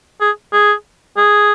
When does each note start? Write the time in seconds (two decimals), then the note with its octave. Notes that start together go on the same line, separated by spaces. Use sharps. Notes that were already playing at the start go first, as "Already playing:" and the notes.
0.21 G#4
0.53 G#4
1.17 G#4